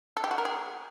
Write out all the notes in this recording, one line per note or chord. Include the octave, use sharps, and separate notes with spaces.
A4
G4
F#4
A#4
G#4